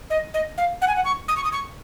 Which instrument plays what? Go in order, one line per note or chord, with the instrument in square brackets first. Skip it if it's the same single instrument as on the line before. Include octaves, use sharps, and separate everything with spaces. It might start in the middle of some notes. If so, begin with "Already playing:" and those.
[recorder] D#5
D#5
F5
F#5
G#5
F#5
C#6
D#6
C#6
D#6
C#6